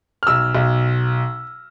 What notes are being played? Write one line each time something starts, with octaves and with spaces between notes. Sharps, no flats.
F6
B1 E6
B1